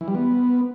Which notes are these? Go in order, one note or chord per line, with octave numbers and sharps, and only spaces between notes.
E3
G3
B3